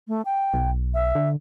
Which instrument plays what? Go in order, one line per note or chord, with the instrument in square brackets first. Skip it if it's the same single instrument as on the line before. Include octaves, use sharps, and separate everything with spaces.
[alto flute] A3
G5
[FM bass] B1
[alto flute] E5
[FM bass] D3